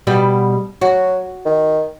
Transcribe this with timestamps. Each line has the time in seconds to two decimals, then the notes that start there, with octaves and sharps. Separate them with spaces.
0.07 B2 G3 G4
0.81 F#3 F#4
1.46 D#3